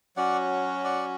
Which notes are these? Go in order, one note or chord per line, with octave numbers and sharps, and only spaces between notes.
F#3 C#4 F#4 D5 F#5
D5 F#5